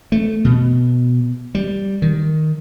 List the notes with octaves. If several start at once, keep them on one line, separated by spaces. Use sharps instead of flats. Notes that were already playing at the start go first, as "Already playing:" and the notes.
A3
B2
G3
D#3